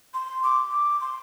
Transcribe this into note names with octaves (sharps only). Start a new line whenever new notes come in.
C6
D6
D6
C6